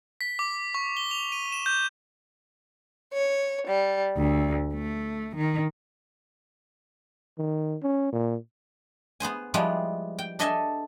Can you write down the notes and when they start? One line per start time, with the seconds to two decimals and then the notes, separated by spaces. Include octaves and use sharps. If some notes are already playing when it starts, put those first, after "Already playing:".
0.21 B6
0.39 D6
0.75 C#6
0.97 G7
1.11 F7
1.32 D#7
1.52 E7
1.66 G6
3.12 C#5
3.67 G3
4.17 D2
4.74 A3
5.36 D#3
7.38 D#3
7.83 C#4
8.13 A#2
9.20 B3 G#4 C5 G#5
9.54 F3 G3 G#3 B3 E4
10.19 G5
10.39 D4 A4 D#5 E5 G#5 A5